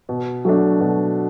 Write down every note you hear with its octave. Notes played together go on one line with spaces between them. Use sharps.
B2
F#3 A3 D4
B2